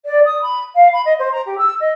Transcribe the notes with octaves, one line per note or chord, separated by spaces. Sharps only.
D5
D#6
B5
F5
B5
D#5
C5
A#5
G4
E6
D#5